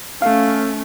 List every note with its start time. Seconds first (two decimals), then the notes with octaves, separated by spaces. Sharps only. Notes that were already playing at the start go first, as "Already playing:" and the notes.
0.22 A3 C#4 F5